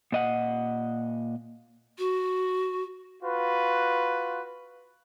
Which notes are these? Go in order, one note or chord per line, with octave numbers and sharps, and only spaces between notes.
A#2 D#5 F#5
F#4
F4 F#4 B4